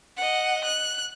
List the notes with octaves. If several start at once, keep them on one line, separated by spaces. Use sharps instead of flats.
D#5 F#5
F#6